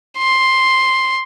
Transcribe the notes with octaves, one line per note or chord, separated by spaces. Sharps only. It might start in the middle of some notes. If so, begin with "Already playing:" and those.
C6